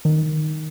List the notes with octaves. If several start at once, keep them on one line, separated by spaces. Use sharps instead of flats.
D#3